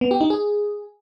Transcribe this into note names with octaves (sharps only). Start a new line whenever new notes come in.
B3
G4
D#4
G#4